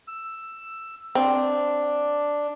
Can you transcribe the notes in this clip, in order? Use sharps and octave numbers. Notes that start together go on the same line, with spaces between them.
E6
C4 D4